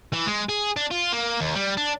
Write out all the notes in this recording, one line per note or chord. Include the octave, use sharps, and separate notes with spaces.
E3
G#3
G#4
D4
F4
A#3
D#2
G3
D4